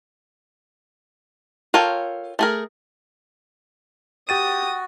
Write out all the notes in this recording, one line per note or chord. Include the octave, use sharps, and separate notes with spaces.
F4 A4 A#4 C#5 G5
A3 G#4 A#4
F#4 G4 G5 D#6 A6 D#7